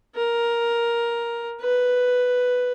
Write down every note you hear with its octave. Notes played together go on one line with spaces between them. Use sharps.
A#4
B4